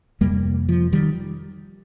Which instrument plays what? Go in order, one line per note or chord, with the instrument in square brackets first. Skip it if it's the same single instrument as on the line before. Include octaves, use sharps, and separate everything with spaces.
[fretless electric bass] F2 C3 G3 A#3
F3
D#3 G3